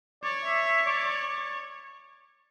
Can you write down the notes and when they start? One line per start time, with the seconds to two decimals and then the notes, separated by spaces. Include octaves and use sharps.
0.23 C#5 D5
0.45 E5
0.65 E5
0.86 D5